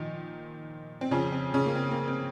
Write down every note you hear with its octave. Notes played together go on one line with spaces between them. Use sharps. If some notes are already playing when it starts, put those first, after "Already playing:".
Already playing: A#2 D#3 F3 D#4
C4
F2 C#3 F3 C#4
C4
C#3 C#4
A#3
C4
A#3
C4